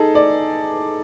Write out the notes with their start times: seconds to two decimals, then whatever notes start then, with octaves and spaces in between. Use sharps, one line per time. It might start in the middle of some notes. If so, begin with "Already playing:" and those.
Already playing: D#4 G#4 A4
0.15 D5